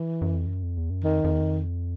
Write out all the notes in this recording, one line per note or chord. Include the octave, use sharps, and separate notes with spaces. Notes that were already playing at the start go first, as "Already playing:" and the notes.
Already playing: E3
F#2
F2
F#2
F2
E2
F#2
F2 D#3
F2
E2
F2